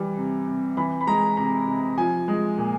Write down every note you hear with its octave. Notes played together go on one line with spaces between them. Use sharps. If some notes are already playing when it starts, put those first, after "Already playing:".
Already playing: E3 G3
C3
C3
E3 B5
B5
G#3 A#5
C3 A#5
C3
F3 G#5
G#3
A#2